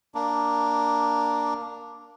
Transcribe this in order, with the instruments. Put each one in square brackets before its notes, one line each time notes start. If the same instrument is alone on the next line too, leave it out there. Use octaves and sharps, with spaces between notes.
[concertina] A#3 D4